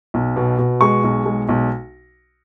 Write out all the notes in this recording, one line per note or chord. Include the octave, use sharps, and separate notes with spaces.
B1
B2
B2
G#3 C#6
B1
G#3
B1